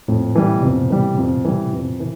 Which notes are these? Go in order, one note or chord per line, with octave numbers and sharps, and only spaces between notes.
F2 A2
E3 G3
B2
F2 C3
E3 G3
F2
E3 G3
F2
E3